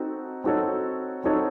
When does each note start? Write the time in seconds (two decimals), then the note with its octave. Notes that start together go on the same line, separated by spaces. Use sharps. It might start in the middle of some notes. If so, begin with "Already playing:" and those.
Already playing: C4 D#4 F#4 A4
0.44 C4 D#4 F#4 A4 C#5
1.24 C4 D#4 F#4 A4 C#5